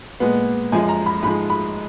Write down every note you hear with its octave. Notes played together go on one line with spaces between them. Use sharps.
A#2 G#3 B3
F#2 F3 G#3 G#5
A#5
B5
G#2 F3 G#3 B5
B5